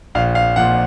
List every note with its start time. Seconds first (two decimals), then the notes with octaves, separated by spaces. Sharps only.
0.15 A#1 F5
0.35 F5
0.56 A#2 F3 F#5